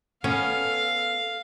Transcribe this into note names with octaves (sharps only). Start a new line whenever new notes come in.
B3 C#4 A4 F5